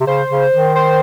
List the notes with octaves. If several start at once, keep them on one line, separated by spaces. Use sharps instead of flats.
C3
C#3 C5
C#3
D#3
C5